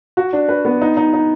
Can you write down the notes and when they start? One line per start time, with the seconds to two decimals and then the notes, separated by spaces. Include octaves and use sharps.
0.17 F#4
0.33 D4
0.49 B4
0.65 B3
0.82 D#4
0.97 D#4
1.13 D#4